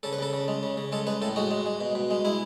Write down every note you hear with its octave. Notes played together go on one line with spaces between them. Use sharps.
C#3 A4
B4
C#3 A4
C#3
G#3
C#3
C#3
G#3 A4
G#3 B4
A2 A4
G#3 F#4
G#3
G#3
B2
B2
G#3
G#3 E4